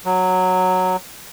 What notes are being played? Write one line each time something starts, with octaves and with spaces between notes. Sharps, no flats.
F#3